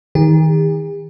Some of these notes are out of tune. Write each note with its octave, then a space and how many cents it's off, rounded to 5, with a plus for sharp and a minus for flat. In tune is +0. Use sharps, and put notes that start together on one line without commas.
D#3 +20 G4 +45